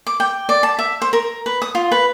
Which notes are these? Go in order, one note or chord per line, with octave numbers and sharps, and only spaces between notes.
D6
G5
D5
A5
E5
C5
A#4
B4
D#6
F4
B4